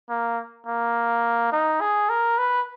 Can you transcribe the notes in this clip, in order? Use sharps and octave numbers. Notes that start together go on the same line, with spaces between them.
A#3
A#3
D#4
G#4
A#4
B4